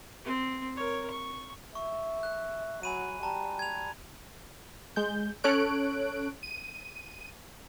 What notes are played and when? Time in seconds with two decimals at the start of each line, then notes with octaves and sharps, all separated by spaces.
0.25 C4
0.77 A#4 C#5
1.11 C#6
1.75 E5 C#6
2.23 F#6
2.83 F#3 G#5 B5 D#7
3.23 G3 A5 A#5
3.59 G#6 F7
4.96 G#3 G6
5.44 C#4 A4 C#5 F#6 D7
6.43 D#7